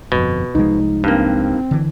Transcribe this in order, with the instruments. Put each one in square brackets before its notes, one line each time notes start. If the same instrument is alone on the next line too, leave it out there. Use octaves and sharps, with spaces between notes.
[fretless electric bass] G1 F2 [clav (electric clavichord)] B2
[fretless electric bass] C2 F3 G#3 [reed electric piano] D#4
[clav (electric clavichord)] G2 A#3 [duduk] C4
[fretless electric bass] D3 E3